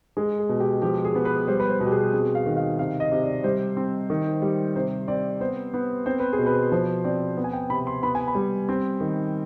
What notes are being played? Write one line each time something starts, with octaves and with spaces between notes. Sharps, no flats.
G#3 G#4
G#4
B2
G4
F3 G4
G#4
B3
B4
G3 C5
B4
C5
B2
G4
G#4
C4 G#4
F5
D#3
F5
C3 F5
D#5
C3
D5
G3 C5
C4
D#3
G3
C3 C5
C4 D5
B3 C5
B3
C4 C5
B4
G#4
B2
B4
F3 C5
C4 D5
B3
G#5
G5
C3 B5
C6
B3 B5
G#5
B5
G3
C4
D#3